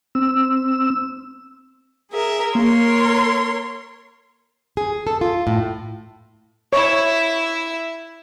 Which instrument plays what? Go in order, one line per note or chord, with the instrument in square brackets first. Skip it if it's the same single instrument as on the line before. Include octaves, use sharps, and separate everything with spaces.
[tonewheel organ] C4 E6
[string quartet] G#4 A#4 E5
[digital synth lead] A#3 [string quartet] A#4 C#5 C6
[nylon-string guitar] G#4
A4
F4
A2
[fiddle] E4 E5 [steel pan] C#5